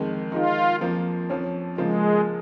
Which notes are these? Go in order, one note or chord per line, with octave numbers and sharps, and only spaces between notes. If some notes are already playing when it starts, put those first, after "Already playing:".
Already playing: F2 D#3 G#3
D#3 G#3 D#4 F4
F2 F3 A#3
F2 F3 C#4
C#3 F3 G#3 A#3 F4